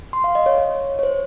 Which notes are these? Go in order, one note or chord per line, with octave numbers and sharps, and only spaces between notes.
C6
F5
D#5
C#5
C#5
C#5
C5